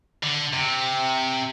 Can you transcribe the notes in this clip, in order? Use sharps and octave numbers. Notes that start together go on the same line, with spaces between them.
D3
C3